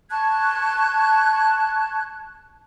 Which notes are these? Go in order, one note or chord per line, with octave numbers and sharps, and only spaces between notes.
A5 C#6 F#6 G#6